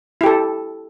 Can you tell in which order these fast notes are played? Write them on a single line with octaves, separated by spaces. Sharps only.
E4 G4 A4